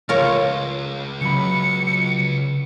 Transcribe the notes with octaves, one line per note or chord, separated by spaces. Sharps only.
C#2 F4 A#4 C#5
C#3 F#3 B5 C#7